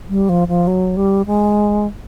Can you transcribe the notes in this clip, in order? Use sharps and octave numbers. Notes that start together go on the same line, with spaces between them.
G3
F3
F3
F#3
G3
G#3